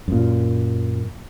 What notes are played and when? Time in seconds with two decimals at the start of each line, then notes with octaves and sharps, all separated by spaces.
0.08 F#2 A#2